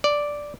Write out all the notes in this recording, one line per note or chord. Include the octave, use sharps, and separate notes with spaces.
D5